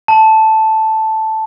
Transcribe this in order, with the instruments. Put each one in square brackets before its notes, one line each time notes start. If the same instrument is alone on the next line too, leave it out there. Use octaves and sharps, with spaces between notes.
[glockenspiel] A5